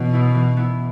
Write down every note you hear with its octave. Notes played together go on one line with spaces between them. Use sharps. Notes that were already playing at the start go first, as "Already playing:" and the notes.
Already playing: B2 E3 C#4 F#4
B3 E4
E3
B3 E4